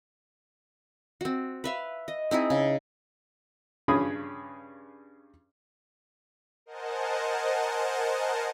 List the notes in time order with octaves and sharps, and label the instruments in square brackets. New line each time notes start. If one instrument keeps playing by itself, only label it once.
[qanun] C4 F#4
B4 E5 F5
D#5
C4 D#4 E4 G#4
C#3
[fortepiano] G2 C#3 C#4 G#4 B5 D#6
[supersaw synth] A#4 C5 D#5 F#5 G#5 A5